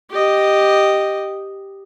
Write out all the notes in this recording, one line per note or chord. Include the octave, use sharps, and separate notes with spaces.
G4 D#5